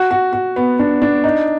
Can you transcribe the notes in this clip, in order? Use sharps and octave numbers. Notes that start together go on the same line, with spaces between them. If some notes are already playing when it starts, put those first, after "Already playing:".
Already playing: F#4
F#4
F#4
B3
D4
D4
D#4